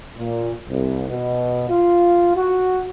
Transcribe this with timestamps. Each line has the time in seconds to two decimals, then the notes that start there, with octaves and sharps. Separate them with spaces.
0.17 A#2
0.69 C2
1.09 B2
1.69 F4
2.35 F#4